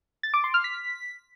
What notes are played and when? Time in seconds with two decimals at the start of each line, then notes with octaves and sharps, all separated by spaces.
0.23 A6
0.34 D6
0.44 C6
0.54 F6
0.64 B6